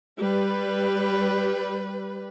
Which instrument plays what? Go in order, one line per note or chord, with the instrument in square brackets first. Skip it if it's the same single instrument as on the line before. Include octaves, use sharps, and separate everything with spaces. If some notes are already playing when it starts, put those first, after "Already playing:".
[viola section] G3 B4